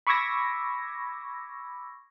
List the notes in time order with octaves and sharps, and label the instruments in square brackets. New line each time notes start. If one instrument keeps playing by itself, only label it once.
[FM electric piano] B5 C#6 D6 E6 G#6 A#6